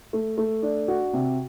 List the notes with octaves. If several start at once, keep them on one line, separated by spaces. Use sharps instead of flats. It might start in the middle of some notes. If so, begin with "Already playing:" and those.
A3
A3
D4
F#4
C3